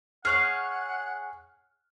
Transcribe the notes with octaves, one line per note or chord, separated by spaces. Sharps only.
G#4 C#5 F5 F#5 F6 F#6